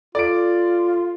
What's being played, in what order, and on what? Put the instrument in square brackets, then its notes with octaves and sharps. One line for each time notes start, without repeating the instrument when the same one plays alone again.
[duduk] F4 [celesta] A4 [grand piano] D5 D7